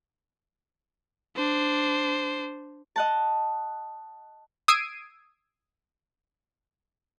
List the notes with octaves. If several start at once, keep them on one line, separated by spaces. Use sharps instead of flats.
D4 C5
D#5 F#5 A5
D#6 E6 G#6 C7 D7 D#7